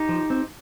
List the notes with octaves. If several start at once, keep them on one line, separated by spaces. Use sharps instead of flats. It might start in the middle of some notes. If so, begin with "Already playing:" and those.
Already playing: D#4 G4
F3
C4